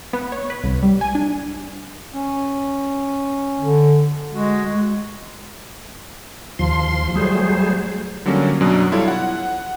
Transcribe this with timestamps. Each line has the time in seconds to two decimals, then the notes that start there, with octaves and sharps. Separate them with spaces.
0.13 B3
0.32 C#5
0.50 B4
0.63 C2
0.83 G3
1.01 G#5
1.15 D4
2.13 C#4
3.60 D3
4.34 G#3 F#4
6.59 D#2 F3 C6
7.16 F#3 G3 A3 G#4 C5
8.26 D3 F#3 G3 A#3 C#4
8.61 F#2 B2 F#3 D4
8.92 G3 E4 F4 A4 C#5
9.08 F#5